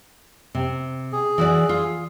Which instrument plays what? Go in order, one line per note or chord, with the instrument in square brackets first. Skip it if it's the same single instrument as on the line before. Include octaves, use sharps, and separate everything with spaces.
[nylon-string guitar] C3
[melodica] G#4
[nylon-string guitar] E3 F#4 D5
F4